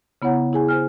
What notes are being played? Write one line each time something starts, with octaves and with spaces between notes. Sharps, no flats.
C#3 B3 E4 C#5 F#5 A#5
E4 G#4 G#5
C5 G#5 F6